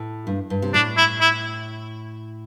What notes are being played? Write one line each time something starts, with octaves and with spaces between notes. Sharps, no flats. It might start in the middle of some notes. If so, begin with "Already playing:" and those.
Already playing: A2
G2
G2
C3
A2 D4
E4
E4